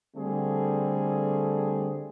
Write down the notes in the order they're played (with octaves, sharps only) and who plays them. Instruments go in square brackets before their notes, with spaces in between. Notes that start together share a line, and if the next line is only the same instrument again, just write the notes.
[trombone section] D3 G3 A3 C4 G#4